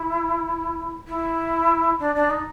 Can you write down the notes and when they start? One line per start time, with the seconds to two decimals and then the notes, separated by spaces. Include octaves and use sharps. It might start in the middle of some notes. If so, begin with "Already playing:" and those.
Already playing: E4
1.08 E4
1.99 D4
2.15 D4
2.30 D#4